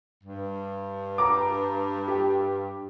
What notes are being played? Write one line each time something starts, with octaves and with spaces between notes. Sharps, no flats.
G2
A#5 D6
G4